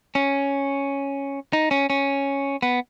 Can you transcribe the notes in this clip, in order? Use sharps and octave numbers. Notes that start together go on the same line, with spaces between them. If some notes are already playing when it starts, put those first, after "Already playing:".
C#4
D#4
C#4
C#4
B3